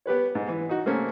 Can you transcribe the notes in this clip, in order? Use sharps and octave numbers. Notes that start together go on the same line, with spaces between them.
B3 G4 B4 C#5
G#2
E3
D#4 F#4
C3 A3 A#3 C4 C#4